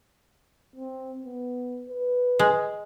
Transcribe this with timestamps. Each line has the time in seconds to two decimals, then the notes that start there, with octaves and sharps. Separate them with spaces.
0.76 C4
1.26 B3
1.90 B4
2.39 G#3